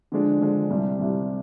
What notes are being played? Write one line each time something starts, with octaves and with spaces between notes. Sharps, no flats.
D3 F3 G#3 D4
D3 F3 G#3 D4
C2 C3 G3
C2 C3 G3